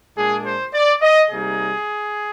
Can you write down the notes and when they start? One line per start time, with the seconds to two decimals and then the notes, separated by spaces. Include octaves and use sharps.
0.15 A#2 G#3 D4 G#4
0.45 C5
0.73 D5
1.02 D#5
1.31 C3 G3 A#3 D#4 G#4